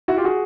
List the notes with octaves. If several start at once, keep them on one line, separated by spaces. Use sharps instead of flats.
E4 F#4
F4 G4
F#4 G#4